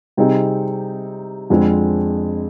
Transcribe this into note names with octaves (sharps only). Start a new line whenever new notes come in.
C3 G3 C4 D#4 G#4
F2 D3 G#3 C4